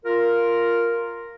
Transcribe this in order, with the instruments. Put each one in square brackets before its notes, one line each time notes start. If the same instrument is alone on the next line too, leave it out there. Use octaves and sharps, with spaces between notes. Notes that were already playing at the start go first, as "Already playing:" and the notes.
[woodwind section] F4 A#4